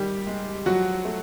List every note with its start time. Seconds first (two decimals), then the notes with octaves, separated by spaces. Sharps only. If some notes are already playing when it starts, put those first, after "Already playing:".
Already playing: D#3 G3 G4
0.27 G#3
0.66 F3 F#3 F#4
1.05 A3